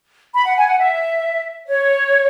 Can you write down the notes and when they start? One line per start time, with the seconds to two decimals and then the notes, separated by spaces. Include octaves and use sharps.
0.34 B5
0.45 F#5
0.57 G#5
0.68 F#5
0.78 E5
1.67 C#5